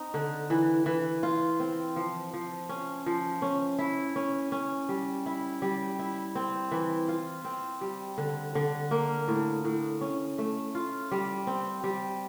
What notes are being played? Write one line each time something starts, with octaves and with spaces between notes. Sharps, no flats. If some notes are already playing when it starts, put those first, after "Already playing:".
Already playing: C4 D#4
D3
E3
E3
F4
C4
F3
F3
C#4
F3
C#4
E4
C#4
C#4
G3
E4
G3
E4
C4
E3
F4
C4
G3
D3
D3
A#3
A2
A2
C#4
A3
F4
G3
C4
G3